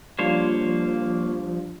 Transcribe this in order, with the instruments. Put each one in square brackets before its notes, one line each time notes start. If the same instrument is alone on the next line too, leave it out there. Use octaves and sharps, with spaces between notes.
[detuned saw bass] F3 [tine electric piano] G3 D4 F4 [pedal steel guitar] A#3 C5 C#5